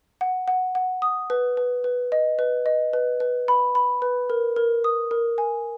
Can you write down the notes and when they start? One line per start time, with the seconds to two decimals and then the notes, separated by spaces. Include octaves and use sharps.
0.21 F#5
0.48 F#5
0.75 F#5
1.02 D#6
1.30 B4
1.57 B4
1.84 B4
2.12 D#5
2.39 B4
2.66 D#5
2.93 B4
3.20 B4
3.48 B5
3.75 B5
4.02 B4
4.30 A#4
4.56 A#4
4.84 D#6
5.11 A#4
5.38 G#5